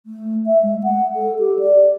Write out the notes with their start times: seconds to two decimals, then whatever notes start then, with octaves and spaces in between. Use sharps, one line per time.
0.06 A3
0.46 E5
0.63 G#3
0.83 F#5
1.16 A4
1.39 G4
1.59 D5